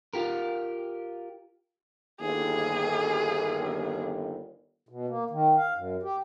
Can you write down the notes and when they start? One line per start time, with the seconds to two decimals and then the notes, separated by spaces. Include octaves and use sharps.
0.14 F4 G4 A#4
2.20 G1 D#2 G#4
4.89 B2
5.08 A#3
5.30 D#3
5.57 F5
5.75 F#2
6.03 G4